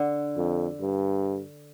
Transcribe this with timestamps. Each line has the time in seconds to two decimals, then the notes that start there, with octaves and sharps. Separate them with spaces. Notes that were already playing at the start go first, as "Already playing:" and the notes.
Already playing: D3
0.37 F2
0.80 G2